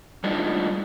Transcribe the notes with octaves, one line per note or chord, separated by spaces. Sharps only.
G3 G#3 D4 D#4 F4